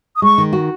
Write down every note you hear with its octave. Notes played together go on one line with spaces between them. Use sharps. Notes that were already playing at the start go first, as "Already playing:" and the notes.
D#6
G#3 C#6
D#3
F#4